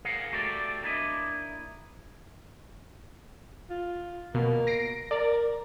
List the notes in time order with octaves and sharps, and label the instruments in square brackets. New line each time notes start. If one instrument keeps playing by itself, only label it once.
[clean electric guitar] G#4 A#4 F5 F#5
A3 F#4 G4 A4 D5
A#3 D4 E4 D#5
[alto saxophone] F4
[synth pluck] B2 [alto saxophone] A#3
[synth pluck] A#6 C7 D7
[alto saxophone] A#4 [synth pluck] D5